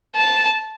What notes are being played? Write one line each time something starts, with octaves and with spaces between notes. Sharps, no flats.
A5